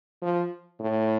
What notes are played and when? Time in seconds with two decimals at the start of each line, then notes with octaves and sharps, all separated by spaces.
0.22 F3
0.80 A2